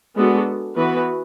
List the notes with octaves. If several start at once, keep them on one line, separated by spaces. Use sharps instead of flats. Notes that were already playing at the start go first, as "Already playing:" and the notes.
G#3 B3 D4 F#4 A4
E3 B3 F#4 B4